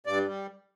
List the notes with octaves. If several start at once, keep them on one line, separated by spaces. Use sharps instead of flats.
G2 D5
G3